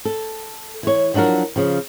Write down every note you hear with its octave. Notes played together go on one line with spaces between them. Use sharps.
A4
E3 C#5
F3 F#3 D4 F#4 A#4
C#3 F3